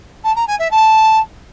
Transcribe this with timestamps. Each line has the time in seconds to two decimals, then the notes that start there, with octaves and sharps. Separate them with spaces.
0.24 A5
0.36 A#5
0.47 G#5
0.59 E5
0.71 A5